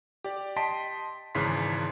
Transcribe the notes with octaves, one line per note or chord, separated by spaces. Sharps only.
G4 D5
D#5 G5 A5 C6 B6 D7
G#1 C#3 E3 B4 C6 B6